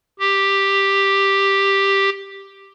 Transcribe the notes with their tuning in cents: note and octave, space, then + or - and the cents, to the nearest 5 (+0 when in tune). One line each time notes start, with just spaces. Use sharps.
G4 +5